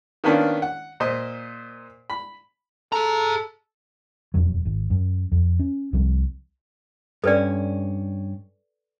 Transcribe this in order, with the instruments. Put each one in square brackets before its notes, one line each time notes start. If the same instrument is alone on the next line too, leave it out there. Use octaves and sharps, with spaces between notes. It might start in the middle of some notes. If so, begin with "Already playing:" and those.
[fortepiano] D#3 A#3 B3 C#4 D4 F4
F#5
A#2 C5 D#5
B5
[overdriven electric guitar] G#4 A#5 [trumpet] A4
[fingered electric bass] E1 F2 F#3
G#1
F#2
F2
C#4
C2 C3 F3 G3
[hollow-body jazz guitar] G2 C#4 [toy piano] A4 B4 D5